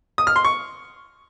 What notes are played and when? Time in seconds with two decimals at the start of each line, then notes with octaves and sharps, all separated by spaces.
0.18 D#6
0.27 F6
0.36 C6
0.45 C#6